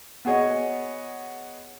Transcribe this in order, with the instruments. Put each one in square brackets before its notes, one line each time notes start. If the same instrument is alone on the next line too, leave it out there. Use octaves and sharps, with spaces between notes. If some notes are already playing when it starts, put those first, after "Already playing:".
[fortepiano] B3 F#4 G#4 C#5 D#5